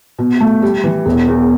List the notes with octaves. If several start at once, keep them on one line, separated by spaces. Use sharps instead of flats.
B2
A3
G3
E3
E1
E2